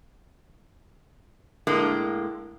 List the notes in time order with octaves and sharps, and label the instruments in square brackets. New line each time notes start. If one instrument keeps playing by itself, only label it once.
[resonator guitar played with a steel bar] A2 D3 G#3 A#3